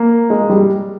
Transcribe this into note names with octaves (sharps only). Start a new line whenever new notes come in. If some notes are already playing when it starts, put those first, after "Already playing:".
Already playing: A#3
G#3
G3